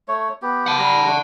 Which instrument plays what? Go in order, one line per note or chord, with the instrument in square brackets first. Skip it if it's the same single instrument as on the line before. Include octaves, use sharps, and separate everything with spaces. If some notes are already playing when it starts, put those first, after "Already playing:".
[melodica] A3 C#5
B3 G4
[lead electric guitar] F#5 A5
[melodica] G3 A#5
A3 D4